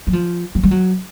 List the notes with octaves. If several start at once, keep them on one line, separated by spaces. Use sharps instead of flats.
F#3
F3
F#3
G3
F#3